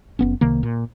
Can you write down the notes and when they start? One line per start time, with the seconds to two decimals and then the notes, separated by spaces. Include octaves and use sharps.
0.19 F#1 B3 C#4
0.41 C2 C3 D#3 A#3
0.63 A#2